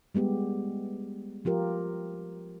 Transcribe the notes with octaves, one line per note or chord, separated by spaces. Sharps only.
G3 G#3 B3 G4
F3 F4 G4 A#4